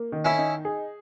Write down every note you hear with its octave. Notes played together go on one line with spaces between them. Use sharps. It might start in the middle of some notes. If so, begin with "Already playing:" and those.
Already playing: A#3
D#3
C#4 E4
D#4
G#4